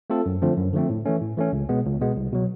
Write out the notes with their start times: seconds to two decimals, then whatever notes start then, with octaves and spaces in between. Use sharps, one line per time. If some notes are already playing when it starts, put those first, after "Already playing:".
0.10 A3 C4 F4 A4
0.26 F#2
0.42 D3 F3 A3 C4
0.58 F#2
0.73 D3 F3 A3 C4
0.90 A2
1.05 E3 A3 C#4
1.22 A2
1.37 E3 A3 C#4
1.53 C#2
1.69 B2 G#3 B3
1.85 C#2
2.01 B2 G#3 B3
2.17 C2
2.32 B2 F#3